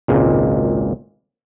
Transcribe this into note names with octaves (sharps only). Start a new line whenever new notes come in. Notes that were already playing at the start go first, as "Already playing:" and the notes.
G#1 C#2 A#2